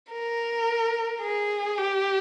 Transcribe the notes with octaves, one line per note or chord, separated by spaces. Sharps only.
A#4
G#4
G4